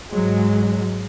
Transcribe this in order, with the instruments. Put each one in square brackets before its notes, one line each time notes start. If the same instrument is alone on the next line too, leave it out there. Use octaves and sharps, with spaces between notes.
[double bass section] G#2 F#3 G#3